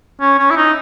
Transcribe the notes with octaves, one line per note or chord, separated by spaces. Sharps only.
C#4
C#4
E4
D#4